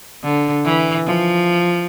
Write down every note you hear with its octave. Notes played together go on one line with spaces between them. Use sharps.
D3
E3
F3